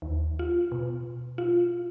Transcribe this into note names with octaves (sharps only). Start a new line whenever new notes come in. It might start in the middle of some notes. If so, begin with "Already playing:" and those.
D#2
F4
B2
F4